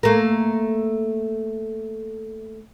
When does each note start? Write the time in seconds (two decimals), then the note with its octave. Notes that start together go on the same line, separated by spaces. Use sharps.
0.03 A3 A#3